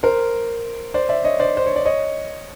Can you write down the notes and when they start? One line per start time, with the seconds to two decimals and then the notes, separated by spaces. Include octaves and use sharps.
0.03 A#4 C5
0.94 C5 D5
1.09 D5 E5
1.24 C#5 D#5
1.40 C5 D5
1.57 C5
1.66 C#5
1.76 D5
1.85 C#5 D#5